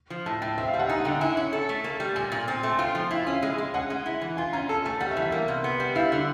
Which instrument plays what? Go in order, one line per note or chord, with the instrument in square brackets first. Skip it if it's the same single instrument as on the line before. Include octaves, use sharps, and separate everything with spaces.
[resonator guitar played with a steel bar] F3
[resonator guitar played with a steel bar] A2 [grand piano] A5
[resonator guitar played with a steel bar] A2 [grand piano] G5
[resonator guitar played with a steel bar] C4 [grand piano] E5
[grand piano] F5
[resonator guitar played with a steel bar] G3
[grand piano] F#5
[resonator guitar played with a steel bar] D#4 [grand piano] G#5
[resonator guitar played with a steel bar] D3 [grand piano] G5
[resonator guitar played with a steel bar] E4 [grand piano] G#5
[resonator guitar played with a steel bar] C#4
A4
A3
A#3
G3
[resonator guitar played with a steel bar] A#2 [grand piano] G#5
[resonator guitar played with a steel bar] A#2
C4
A3
[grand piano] G#5
[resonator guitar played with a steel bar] F4 [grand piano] G5
[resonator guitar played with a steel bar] F3
[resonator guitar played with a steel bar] E4 [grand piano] F5
[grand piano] E5
[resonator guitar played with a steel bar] C#4
[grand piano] F5
[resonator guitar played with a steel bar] G#3
G#3
[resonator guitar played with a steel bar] C#4 [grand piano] F#5
[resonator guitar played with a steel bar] G#3
E4
E3
[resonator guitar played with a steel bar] F4 [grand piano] G#5
[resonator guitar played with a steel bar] C#4 [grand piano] A#5
[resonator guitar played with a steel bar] A4 [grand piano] A5
[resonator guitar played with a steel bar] A3 [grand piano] G#5
[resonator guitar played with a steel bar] G3 [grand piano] F#5
[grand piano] E5
[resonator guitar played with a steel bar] E3
[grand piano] E5
[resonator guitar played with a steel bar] A#3
C3
B3
G3
[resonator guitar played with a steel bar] E4 [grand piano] F5
[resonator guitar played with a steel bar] D3 [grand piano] E5